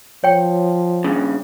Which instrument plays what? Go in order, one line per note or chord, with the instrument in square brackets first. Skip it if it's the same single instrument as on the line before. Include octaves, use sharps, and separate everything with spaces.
[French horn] F3 [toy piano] C#5 G5
[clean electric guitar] G2 A#2 C#3